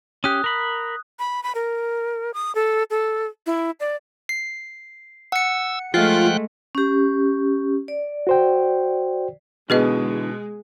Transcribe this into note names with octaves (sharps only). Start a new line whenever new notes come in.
C#4 G4 D#6 F#6
A#4 B5
B5
B5
A#4
D#6
A4
A4
E4
D5
C7
F#5 E6 C#7
F3 G#3 A3 F4 G5 F#6
C#4 G4
D5
F#4 C5 G5
B2 D3 E3 G#3 G#4 B4 D#5